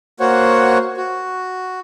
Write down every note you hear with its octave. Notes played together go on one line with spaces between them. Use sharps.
A#3 F#4 C5 C#5 F#5
F#4